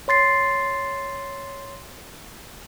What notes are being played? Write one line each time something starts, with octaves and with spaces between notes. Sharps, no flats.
C#5 C6 A6 C7